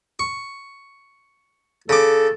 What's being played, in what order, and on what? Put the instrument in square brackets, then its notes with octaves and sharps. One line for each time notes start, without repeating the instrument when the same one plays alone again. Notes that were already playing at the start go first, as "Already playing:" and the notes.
[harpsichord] C#6
[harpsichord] C#3 D6 [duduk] A4